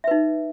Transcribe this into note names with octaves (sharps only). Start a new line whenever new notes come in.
D#4 B4 E5